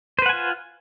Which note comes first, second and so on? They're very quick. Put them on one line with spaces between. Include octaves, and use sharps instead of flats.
C5 B4 F#5 G#5 F4